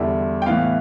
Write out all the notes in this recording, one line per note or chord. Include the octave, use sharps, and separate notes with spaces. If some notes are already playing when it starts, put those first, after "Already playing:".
Already playing: E2 D3 G3 E5
G5
A2 E3 B3 F5